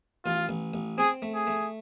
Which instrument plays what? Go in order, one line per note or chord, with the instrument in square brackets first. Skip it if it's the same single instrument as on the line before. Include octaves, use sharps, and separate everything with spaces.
[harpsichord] A1 [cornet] F4
[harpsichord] A1
A1
[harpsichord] C4 [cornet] G#4
[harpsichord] A3
[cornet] G#4
[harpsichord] A3